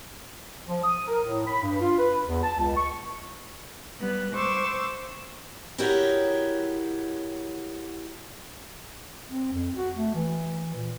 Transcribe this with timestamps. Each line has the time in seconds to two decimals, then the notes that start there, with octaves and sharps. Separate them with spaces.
0.68 F3
0.84 D#6
1.07 A#4
1.25 A2
1.47 B5
1.63 G2
1.80 F4
1.99 B4
2.27 E2
2.43 A5
2.59 C#2
2.77 C#6
3.99 G3 B3 F#6
4.33 C5 C#6 D6 E6
5.78 E4 F#4 G4 A#4 C#5 D#5
9.29 C4
9.53 F2
9.76 F#4
9.96 A3
10.15 E3
10.75 A#2